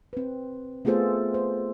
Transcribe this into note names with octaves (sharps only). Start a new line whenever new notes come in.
C4 B4
A3 B3 F4 G#4 A4 C5
C5